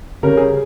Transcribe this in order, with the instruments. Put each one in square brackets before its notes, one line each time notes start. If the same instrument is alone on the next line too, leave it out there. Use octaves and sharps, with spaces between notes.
[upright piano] C#3 G3 C#4 A#4
G#4